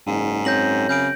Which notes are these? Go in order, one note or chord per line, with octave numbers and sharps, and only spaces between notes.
F#1 G#2
F#2 C4 C#5 G6 A#6 F#7
C#3 G6 D7